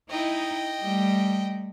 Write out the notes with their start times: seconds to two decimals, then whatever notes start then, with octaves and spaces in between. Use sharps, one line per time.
0.10 D#4 E4 D#5 G5
0.81 G3 A3